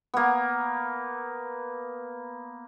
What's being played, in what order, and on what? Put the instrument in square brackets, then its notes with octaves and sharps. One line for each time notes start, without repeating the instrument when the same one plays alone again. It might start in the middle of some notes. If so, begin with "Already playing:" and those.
[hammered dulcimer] A#3 B3